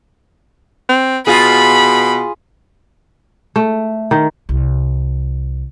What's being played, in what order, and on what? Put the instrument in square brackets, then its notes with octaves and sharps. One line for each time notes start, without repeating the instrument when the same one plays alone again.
[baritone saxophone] C4
[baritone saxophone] B2 [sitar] F4 G#4 [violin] B5
[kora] A3
D#3
[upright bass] C2